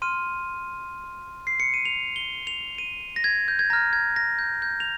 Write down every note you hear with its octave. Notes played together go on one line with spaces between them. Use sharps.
C6 F6 D#7
C7
C#7
D#7
F7
G7
F7
D#7
A#6
G#6
G6
G#6
A#5 F6 A#6
G#6
A#6
G6
G6
F7